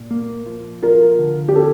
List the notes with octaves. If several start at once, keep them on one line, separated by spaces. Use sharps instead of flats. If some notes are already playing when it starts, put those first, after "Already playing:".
Already playing: A#2
A#3
F3
F4 A#4
D3
G4
C#4 A4